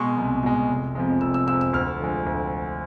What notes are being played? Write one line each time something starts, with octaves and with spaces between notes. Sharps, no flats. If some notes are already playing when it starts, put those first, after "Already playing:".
Already playing: B2 G#3 C6 C#6
C2
B2 G#3
F1
F2 C3 F3 G#3
F1 E6
E6
F2 C3 F3 G#3 E6
E6
D2 F6
D3 F3 G#3
D2